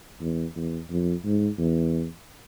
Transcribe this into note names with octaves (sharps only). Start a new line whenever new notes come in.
E2
E2
F2
G#2
E2